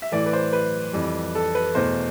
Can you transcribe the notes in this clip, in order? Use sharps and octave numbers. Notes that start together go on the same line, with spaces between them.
E5
A2 E3 A3 D5
B4
C5
B4
F2 E3 G3
A4
B4
E2 B2 A3 C5